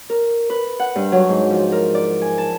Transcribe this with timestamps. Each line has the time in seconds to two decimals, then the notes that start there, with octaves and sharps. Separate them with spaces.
0.10 A#4
0.50 B4
0.80 F#5
0.96 G2
1.12 F#3
1.29 G#2
1.50 F3
1.72 A#4
1.95 D5
2.21 G#5
2.38 A5